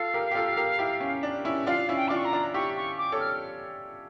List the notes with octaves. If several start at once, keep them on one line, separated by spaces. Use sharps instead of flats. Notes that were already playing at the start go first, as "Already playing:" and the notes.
Already playing: F4 A4 F5
G4 A#4
G4
F4 A4
G4 A#4
E4 G4
C#4
D4
C#4 E4
D4 F4 F5
C#4 E4
G5
D4 F4 D6
C#6
A#5
D4 F4
E4 G4 C#6
C#6
D6
A4 C#5
F6